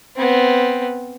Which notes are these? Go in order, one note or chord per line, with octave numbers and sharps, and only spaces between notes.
B3 C4